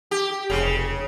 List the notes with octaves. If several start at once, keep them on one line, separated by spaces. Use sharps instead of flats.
G4
F1 C#3